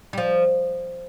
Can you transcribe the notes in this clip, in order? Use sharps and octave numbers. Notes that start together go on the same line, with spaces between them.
G3
F3